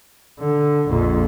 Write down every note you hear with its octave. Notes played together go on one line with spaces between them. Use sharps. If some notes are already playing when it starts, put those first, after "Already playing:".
D3
A#1 F2